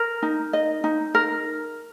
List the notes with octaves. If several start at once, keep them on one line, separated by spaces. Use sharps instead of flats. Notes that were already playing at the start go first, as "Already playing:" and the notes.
Already playing: A#4
D#4
D#5
D#4
A#4